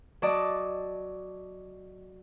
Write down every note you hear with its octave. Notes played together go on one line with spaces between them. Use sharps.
F#3 D5 D#5 A5